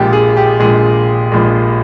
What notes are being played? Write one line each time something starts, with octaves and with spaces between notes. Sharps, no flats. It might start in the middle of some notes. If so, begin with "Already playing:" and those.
Already playing: A#1 A#2 G#3 G4
G#4
G4
A#1 A#2 G#3 G#4
A#1 A#2 G#3